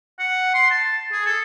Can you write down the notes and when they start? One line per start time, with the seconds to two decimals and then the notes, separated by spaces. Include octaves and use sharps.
0.19 F#5
0.54 C6
0.71 A5
1.12 G#4
1.26 A4